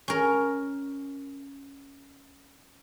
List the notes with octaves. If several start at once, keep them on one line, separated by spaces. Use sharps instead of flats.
C#4 A#4